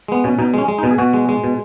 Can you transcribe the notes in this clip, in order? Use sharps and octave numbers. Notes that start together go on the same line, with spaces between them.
G#3 B3
B2 C#4
B2 D#4
G#3 C#4
G#3
D#4
B2
G#4
B2 F#4
G#3
G#3
B2